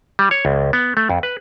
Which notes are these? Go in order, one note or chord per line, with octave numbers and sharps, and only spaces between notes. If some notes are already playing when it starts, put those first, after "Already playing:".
G3
C#5
C#2
B3
A3
F2
B4